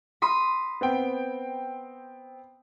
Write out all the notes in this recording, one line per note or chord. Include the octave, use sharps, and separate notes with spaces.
B5 C6 D#6
B3 C4 G5